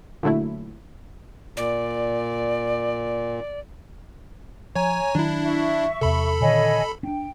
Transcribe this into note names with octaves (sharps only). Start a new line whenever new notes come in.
A#2 D3 F#3 A3 E4
A#2 D5
F3 C#5 G#5 A#5
D#3 F#3 D4 E4
E5 C#6
E2 C3 A4 B5
A#2 D3 D#3 C#5 D#5 G#5
C#4 D4 G5